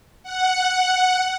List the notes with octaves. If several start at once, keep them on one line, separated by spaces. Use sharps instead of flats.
F#5